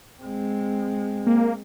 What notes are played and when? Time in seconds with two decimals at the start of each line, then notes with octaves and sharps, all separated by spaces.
0.21 G#3 C4
1.27 A#3